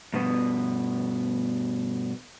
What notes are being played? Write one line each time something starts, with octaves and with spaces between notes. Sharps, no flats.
G2 B2 B3